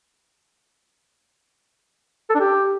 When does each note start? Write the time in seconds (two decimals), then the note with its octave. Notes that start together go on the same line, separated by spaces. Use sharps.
2.30 A4
2.35 D4
2.40 G4